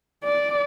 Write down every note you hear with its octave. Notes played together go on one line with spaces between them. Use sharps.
D5